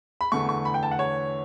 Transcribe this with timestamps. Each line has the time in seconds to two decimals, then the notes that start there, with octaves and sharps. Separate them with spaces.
0.21 B5
0.32 E2 D3 A3 C#6
0.49 C#6
0.65 B5
0.74 G5
0.83 A5
0.91 F#5
0.99 C#5